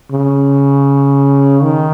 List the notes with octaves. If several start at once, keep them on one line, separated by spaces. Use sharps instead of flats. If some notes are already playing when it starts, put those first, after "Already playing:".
C#3
D#3